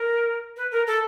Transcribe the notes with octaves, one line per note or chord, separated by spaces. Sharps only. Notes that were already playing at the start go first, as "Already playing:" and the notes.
Already playing: A#4
B4
A#4
A4